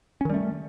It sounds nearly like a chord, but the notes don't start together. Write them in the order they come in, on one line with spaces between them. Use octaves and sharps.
C#4 D#3 G3 A3